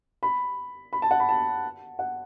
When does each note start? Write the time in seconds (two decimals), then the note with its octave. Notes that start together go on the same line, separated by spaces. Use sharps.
0.23 B5
0.93 B5
1.02 A5
1.11 F#5
1.20 B5
1.29 A5
1.99 F#5